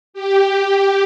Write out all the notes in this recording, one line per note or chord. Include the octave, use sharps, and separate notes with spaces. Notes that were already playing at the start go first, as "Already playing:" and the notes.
G4